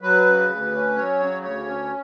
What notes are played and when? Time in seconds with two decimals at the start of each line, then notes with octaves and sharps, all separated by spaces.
0.01 F#3 B4
0.25 C#3
0.49 D2
0.72 C#4
0.96 F#3 C#5
1.20 C#3
1.42 D2 C#5
1.66 C#4